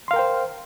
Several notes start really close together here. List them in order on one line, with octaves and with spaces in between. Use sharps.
C6 F5 A#4 G5 C5